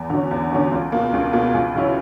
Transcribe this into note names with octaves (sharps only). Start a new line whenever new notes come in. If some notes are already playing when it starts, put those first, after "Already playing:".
Already playing: E2
D3 F#3 C#4
E2
D3 F#3 C#4
C#2
B2 A#3
C#2
B2 A#3
C#2
C#3 F#3 C#4 E4